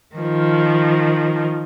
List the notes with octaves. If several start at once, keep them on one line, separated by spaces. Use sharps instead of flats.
D#3 F3